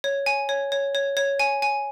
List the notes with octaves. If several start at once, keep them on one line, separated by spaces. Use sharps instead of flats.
C#5
G#5
C#5
C#5
C#5
C#5
G#5
G#5